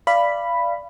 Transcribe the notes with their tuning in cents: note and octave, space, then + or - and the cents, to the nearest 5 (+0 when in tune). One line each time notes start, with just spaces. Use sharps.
D5 +0 F5 -25 B5 +0